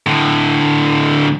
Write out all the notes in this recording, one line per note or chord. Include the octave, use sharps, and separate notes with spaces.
A2 D3